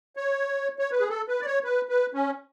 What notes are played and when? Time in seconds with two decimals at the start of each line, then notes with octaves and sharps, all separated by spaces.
0.16 C#5
0.79 C#5
0.91 B4
1.00 G#4
1.09 A4
1.28 B4
1.41 D5
1.46 C#5
1.64 B4
1.89 B4
2.13 C#4